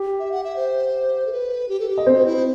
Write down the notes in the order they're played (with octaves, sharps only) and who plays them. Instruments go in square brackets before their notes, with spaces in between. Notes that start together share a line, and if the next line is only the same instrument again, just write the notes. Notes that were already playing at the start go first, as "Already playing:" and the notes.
Already playing: [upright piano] G4
[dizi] E5
F#5
E5
C5
A4
B4
G4
A4
G4
[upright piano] D#5
C4 C5
[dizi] F#4
E4